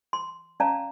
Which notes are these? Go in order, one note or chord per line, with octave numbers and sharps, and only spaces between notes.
C6
C#4 D5 F5 A5 A#5